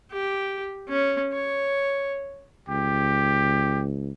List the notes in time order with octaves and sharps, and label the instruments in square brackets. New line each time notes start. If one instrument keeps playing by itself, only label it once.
[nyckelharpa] G4
C#4
C#5
[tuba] C#2 [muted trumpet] G4